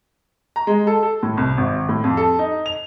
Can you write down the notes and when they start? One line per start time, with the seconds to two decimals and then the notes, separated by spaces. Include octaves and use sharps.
0.56 A#5
0.67 G#3
0.87 A4
1.03 A4
1.23 A2
1.37 C2
1.57 G#1
1.89 A2
2.04 F2
2.17 A4
2.39 D#4
2.66 F7